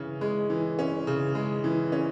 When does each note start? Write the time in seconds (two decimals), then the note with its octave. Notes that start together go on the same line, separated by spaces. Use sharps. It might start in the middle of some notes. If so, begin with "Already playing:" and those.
Already playing: C#3 E3 C#4
0.21 G#3
0.50 E3
0.79 C#4
1.07 C#3
1.35 G#3
1.64 E3
1.92 C#4